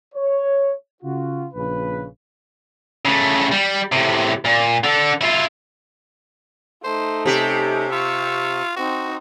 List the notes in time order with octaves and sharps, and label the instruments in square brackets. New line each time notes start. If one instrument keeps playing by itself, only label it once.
[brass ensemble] C#5
C#3 F4 F#4
A#1 C#3 B4
[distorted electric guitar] C#3 A3
G3
A2 C3
A#2
D3 A4
E4 F4
[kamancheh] A3 D#4 [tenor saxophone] C5
[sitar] C3 G4 [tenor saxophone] C#4
[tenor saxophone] F4 [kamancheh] C#6 E6
[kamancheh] C4 D#4 [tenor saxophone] F#4